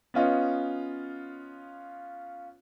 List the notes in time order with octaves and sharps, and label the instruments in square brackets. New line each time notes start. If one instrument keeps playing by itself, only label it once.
[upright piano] B3 C#4 F4 D#5